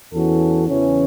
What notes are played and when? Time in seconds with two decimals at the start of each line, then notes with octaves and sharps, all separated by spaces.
0.14 E2 E3 C#4 F#4 A4
0.68 E2 C#3 E3 C#4